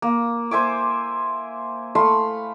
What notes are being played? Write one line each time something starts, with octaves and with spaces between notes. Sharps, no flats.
A#3
C5 E5 G#5 D6
A3 F5 B5 C6